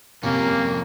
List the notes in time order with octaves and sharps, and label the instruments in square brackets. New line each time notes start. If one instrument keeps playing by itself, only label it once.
[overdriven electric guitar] F2 C#4 [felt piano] C3 [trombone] A#3